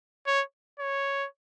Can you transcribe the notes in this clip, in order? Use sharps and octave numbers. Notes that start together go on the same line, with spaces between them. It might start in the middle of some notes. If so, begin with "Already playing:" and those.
C#5
C#5